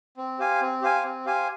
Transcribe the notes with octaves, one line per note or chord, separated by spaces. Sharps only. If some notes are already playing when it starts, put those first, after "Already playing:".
C4
G4 C5 F5 G#5
C4
G4 C5 F5 G#5
C4
G4 C5 F5 G#5